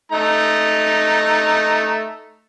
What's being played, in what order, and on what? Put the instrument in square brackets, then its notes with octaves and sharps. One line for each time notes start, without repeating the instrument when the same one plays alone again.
[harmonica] A3 D#4 A#5